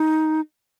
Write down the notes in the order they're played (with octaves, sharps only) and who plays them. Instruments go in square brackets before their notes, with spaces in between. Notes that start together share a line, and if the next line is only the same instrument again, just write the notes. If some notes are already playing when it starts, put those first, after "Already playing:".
Already playing: [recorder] D#4